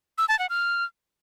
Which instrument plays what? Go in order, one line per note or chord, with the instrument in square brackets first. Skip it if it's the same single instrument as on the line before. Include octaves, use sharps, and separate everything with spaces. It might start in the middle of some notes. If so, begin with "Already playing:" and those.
[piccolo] E6
A5
F#5
F6